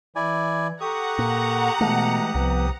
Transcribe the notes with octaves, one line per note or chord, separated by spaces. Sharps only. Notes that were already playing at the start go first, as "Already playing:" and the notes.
E3 E4 D5 G#5
G4 A4 F#5 A#5 C#6 D#6
A#2
B2 E3 G#3 A3 B3
C2 F3 B3 B4